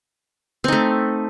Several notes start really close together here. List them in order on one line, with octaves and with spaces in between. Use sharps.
C4 D#4 A3